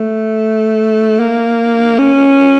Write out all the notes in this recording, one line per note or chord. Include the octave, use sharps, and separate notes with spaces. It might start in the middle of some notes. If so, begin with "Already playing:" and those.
Already playing: A3
A#3
C#4